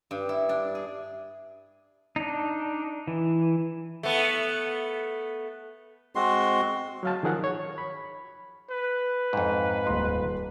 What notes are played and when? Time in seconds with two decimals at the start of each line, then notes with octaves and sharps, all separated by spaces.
0.11 G2
0.29 E4
0.49 D4
0.75 G#4
2.16 D4 D#4
3.07 E3
4.03 A3 B3
6.15 G#3 C4 F#4 C6
7.03 F#3 F5 A5
7.23 D#3 F3 G#4 A#4 F#5
7.44 C#5
7.78 B5
8.70 B4
9.33 F2 G#2
9.87 D#1 A#5 C6